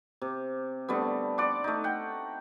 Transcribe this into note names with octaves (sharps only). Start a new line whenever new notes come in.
C3
D3 G3 A3 B3
D5 F#5 C6 D6
A3 D#4
F#5 G5